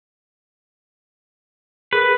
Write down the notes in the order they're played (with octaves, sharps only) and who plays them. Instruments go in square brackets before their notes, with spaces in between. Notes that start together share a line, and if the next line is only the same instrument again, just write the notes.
[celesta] G#4 A#4 [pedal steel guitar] B4